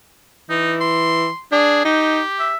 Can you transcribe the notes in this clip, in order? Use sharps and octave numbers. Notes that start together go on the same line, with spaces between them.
E3 D#4
C6
D4 G#4
D#4 G4
E5